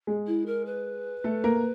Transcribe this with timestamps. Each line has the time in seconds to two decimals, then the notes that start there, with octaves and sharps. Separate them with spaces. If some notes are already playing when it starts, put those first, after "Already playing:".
0.07 G#3 G#4
0.27 E4
0.46 A#4
0.66 B4
1.24 A3 A4
1.44 A#3 A#4